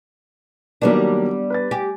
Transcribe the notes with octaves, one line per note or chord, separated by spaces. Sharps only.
D#3 F#3 G3 A#3 B3 D4
B4 A6
G4 G#5